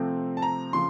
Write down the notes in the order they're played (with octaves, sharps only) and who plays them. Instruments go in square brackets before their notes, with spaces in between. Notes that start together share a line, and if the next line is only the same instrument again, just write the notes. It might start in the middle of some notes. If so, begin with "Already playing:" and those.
Already playing: [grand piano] C3 F3 A3 C4
A5
A#5
C#3 F3 C6